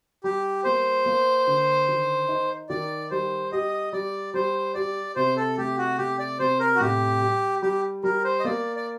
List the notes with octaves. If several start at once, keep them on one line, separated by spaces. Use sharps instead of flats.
G3 G4
A#3 C5
A#3
D3
D#3
D#4
D#3 D5
G3 C5
G4 D#5
G3 D5
G3 C5
G4 D5
C3 C5
A4
A3 G4
F#4
C3 G4
D5
C3 C5
A#4
F#4
A2 G4
G3
G3 G4
G3 A#4
C5
D#5
A#3 D5
D5